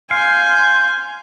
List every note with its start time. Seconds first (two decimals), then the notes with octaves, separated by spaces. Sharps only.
0.11 F5 G#5 C6 G6